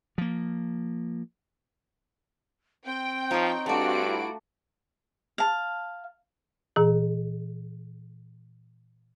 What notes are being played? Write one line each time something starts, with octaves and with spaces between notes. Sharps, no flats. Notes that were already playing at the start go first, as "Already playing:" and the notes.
F3 A#3
C4 G5
F3 D#4 C#5
G2 A3 D4 F4 F#4 D7
E4
F5 A5
A#2 E3 G#4